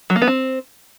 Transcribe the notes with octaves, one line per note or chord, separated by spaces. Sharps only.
F#3
A#3
B3
C4